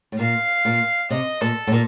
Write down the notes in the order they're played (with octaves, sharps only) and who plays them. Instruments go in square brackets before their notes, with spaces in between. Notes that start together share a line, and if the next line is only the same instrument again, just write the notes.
[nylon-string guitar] A2
[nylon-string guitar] A#2 [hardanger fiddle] F5
[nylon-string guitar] A#2
[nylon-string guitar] C3 [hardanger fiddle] D#5
[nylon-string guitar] A#2 [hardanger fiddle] A4
[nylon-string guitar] A2
A#2